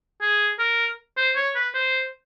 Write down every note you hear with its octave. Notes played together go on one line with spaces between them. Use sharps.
G#4
A#4
C5
C#5
B4
C5